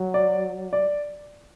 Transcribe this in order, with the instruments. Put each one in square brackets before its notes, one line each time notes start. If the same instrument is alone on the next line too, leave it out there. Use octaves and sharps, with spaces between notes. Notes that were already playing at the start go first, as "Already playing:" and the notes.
Already playing: [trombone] F#3
[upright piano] D5
D5